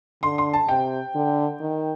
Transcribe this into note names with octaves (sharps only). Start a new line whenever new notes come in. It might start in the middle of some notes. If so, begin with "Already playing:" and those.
D3 C6
C6
A5
C3 G5
D3
D#3